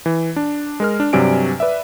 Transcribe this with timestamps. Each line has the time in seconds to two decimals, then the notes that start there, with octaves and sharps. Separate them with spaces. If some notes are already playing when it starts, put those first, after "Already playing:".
0.06 E3
0.36 D4
0.80 G#3 A#4 F6
1.00 D4
1.13 G2 C3 F#3 D5 G#5 D7
1.60 B4 D5 E5